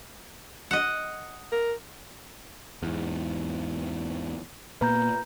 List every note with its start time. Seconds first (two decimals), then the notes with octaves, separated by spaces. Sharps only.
0.71 D#5 F#5
1.52 A#4
2.83 E2 G#2
4.81 A#2 A#3 B3 B4 A#5 G6